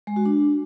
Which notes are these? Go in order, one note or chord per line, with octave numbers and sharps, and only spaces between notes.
G#3
F#4
D4